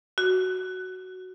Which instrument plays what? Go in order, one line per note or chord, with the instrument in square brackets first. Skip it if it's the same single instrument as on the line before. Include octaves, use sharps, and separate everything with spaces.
[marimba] F#4